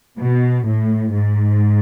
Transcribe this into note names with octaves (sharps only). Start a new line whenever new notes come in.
B2
A2
G#2